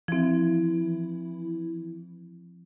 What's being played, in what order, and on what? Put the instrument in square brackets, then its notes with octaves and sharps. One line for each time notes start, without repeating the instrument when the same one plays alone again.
[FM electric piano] E3 E4 [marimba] F3 C4